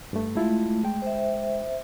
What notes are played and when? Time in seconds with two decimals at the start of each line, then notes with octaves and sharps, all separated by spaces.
0.13 G2 A3
0.35 G#3 A3 E4 F4
0.83 G#3 G5
1.02 C5 E5